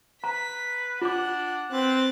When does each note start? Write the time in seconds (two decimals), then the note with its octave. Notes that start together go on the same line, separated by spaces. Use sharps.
0.24 B4 A#5 B6
1.02 D4 F4 F#5 D6
1.72 C4 B4 F#6 A6